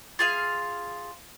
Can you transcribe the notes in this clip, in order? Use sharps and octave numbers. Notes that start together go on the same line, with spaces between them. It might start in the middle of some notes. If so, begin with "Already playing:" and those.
F4 G#4 F5